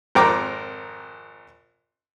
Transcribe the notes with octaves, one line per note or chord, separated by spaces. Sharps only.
G#1 F2 A#4 G5 A#5 D6